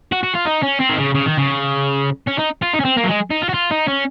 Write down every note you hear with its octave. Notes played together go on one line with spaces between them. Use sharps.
F#4
F#4
F4
D#4
C#4
C4
D#3
C#3
C#3
D#3
C#3
C#4
D#4
F4
D#4
C#4
C4
A#3
F#3
G#3
D#4
F4
F#4
F4
D#4
C#4